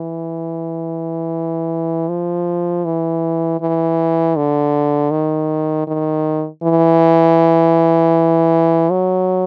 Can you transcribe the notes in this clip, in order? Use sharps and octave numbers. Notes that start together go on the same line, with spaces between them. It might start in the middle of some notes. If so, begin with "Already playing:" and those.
Already playing: E3
F3
E3
E3
D3
D#3
D#3
E3
F#3